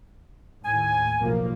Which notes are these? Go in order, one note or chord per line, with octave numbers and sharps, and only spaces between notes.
D#2 A2 G#5
B1 F3 A#3